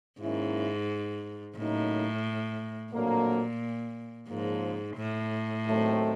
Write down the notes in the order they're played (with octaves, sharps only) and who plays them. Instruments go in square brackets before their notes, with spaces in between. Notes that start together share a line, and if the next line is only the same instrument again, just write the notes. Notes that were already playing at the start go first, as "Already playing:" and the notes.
[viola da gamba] G#2 [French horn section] D#3 F#3 A#3 C#4 E4
[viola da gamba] A2 [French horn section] C#3 F#3 A#3 D#4
[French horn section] F2 D3 F#3 A#3 [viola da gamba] A#2
[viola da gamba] G#2 [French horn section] C#3 F3 A#3
[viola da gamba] A2
[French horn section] D#2 D#3 F#3 A3 C4